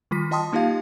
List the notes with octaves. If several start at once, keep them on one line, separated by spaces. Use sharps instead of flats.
D#3 G3 F4 B6
F4 D#5 G5 A5 C6 D#6
A#3 D#4 F4 G4 F5